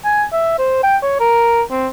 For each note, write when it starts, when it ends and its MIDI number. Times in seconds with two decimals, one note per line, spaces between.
0.05 0.25 80
0.33 0.54 76
0.59 0.79 72
0.83 0.97 79
1.03 1.20 73
1.20 1.62 70
1.71 1.88 60